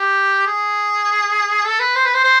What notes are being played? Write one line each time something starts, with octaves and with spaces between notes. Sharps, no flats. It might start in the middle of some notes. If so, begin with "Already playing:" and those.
Already playing: G4
G#4
A4
B4
C5
B4
C5
C5